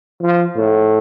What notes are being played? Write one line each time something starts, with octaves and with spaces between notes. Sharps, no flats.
F3
A2